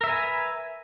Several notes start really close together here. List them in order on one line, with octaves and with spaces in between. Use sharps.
A#4 E5 B4 G#5